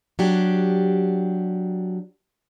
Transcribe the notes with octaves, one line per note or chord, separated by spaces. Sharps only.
F#3 D4 G4